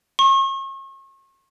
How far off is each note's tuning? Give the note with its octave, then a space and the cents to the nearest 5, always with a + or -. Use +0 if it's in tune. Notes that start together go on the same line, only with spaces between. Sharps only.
C#6 -40